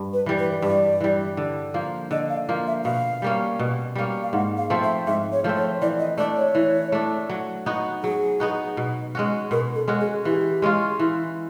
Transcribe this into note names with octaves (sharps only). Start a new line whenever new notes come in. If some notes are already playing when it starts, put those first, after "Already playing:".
Already playing: G2
B4
E3 G3
B4
G2 D5
E3 G3
D3
F3 A#3
D3 D#5
F5
F3 A#3
E5
B2 F5
G3 A#3 C#4
B2
G3 A#3 C#4
F5
G#2 F#5
F5
F3 A3 C4
E5
G#2 E5
C#5
F3 A3 C4
C#5
E3 D5
D#5
A3 D4 D5
C#5
E3
A3 D4
F#3
B3 D#4 F#4
F#3 G#4
B3 D#4 F#4
B2
G#3 C#4 F#4
B2 A#4
A4
G#3 C#4 F#4
G#4
E3 G4
G#3 C#4 F4
E3